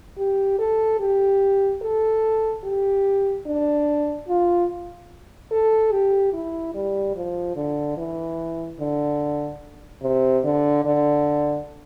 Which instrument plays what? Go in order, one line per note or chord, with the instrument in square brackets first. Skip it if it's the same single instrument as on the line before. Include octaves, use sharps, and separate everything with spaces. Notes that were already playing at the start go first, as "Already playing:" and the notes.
[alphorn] G4
A4
G4
A4
G4
D4
F4
A4
G4
E4
G3
F3
D3
E3
D3
C3
D3
D3